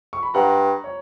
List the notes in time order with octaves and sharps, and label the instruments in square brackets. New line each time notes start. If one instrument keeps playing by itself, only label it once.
[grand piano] C#6
B5
[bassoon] G2 [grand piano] F#5 A#5
[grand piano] C#5